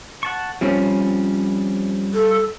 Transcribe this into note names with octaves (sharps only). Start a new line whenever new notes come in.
F#5 A5 C#6
F3 G3 C4 C#4
A4